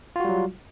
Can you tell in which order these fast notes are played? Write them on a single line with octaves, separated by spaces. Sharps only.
F4 F#4 G3 F#3